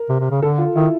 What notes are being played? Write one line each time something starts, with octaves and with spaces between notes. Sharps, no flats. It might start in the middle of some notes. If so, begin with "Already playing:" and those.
Already playing: A#4
C3
C3
C#3
D3 A4
F4
D#3 E4